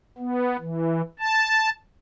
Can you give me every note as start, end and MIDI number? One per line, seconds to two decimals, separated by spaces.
0.18 0.57 59
0.60 1.02 52
1.19 1.70 81